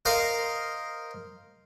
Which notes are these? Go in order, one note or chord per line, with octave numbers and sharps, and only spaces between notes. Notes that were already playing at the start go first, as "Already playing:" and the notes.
A#4 C5 D#5 F5